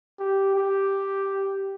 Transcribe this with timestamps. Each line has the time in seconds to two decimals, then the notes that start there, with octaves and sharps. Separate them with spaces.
0.19 G4
0.55 G4